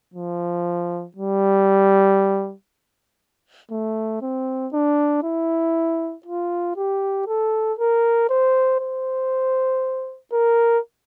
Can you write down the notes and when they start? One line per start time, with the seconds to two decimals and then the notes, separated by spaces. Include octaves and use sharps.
0.14 F3
1.16 G3
3.71 A3
4.22 C4
4.73 D4
5.23 E4
6.26 F4
6.76 G4
7.27 A4
7.79 A#4
8.29 C5
8.80 C5
10.33 A#4